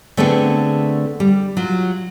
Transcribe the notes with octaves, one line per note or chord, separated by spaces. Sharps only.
D3 A3 B3 C4 D4 G#4
G3
F#3 F4